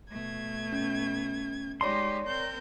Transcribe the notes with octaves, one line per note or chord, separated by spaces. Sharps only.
B2 A3 G#6
C#4
G#3 D#4 G4 C#5 D5 A5 C6
C4 A#4 G6